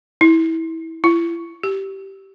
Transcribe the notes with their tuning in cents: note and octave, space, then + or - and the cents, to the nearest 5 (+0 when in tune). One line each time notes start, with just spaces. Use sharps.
E4 -25
E4 +35
G4 -15